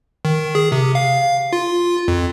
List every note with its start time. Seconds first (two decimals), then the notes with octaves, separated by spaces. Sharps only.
0.25 D#3
0.55 G#4
0.72 C3
0.95 F5
1.53 F4
2.08 F2